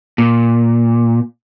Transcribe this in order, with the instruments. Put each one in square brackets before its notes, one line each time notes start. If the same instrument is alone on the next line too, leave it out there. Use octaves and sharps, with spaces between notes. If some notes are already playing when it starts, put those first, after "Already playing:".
[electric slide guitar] A#2